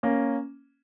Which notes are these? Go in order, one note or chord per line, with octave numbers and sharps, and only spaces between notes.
A#3 C#4